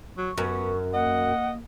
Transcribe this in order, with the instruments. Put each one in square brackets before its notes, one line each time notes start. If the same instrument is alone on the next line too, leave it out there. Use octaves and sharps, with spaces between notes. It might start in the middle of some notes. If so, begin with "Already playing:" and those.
[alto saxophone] F#3 [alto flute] C#6
[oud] F#2 [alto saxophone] B3
[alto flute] A#3 [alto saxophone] D#5 [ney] F#5